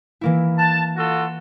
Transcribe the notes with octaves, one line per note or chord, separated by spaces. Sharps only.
E3 A#3 E4
A5 F#6
F4 F#4 A4